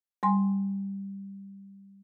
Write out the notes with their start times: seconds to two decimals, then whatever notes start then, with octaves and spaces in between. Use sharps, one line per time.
0.23 G3 G#5 C6